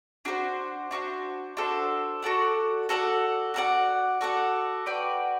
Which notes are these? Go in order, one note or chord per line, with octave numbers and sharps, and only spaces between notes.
D4 F#4 A4 C5
D4 F#4 A4 C5
D4 F#4 A4 C5
F#4 A4 D5 F#5
F#4 A4 D5 F#5
F#4 A4 D5 F#5
F#4 A4 D5 F#5
F#4 B4 D5 G5